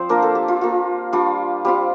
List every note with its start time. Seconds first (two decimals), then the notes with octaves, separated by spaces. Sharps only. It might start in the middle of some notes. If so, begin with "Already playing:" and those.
Already playing: F3 C4 C5 D5
0.09 A#3 D4 F4 A#4
0.22 A4
0.35 G4
0.48 F4
0.61 A#3 F4
1.13 G3 D4 F4
1.65 G3 C4 F4 G4